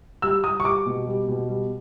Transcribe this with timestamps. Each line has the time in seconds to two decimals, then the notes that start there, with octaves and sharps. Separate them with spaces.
0.22 G3 E6
0.44 G3 D#6
0.60 C#6
0.65 G3 D6
0.86 B2
1.07 G3
1.28 B2
1.50 G3